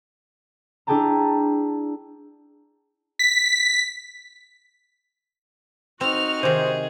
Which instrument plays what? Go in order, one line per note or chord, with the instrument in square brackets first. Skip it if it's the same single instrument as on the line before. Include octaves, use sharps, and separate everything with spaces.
[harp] D4 E4 G#4 G5 A5 A#5
[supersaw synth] B6
[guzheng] C4 [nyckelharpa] D#4 F#4 [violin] F6 F7
[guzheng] C3 D#3 [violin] G#4 [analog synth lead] C5